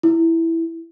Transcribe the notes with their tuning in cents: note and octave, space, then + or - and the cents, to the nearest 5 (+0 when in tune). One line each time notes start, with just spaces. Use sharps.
E4 +0